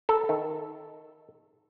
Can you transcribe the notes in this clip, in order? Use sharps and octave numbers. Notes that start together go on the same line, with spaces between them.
A4
D#3